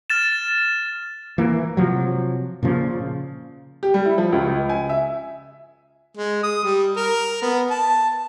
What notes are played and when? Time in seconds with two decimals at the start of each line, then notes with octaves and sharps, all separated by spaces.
0.10 F6 A6 E7
1.38 E3 A#3
1.77 C3 F3 F#3
2.63 A#2 C#3 F3
3.83 G4
3.94 G3
4.05 E4
4.18 F3
4.32 C#2
4.47 C#2
4.69 G#5
4.89 E5
6.17 G#3
6.43 D#6
6.64 G3
6.96 A#4
7.42 B3
7.70 A5